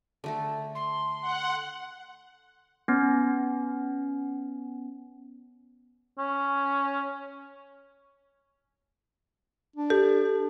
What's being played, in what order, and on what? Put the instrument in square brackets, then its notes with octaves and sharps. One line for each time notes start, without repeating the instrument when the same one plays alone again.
[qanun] D3 A3 A4
[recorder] C6
[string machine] F#5
[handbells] B3 C#4
[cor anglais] C#4
[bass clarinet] D4
[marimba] G4 [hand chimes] A4